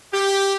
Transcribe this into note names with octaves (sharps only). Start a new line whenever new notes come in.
G4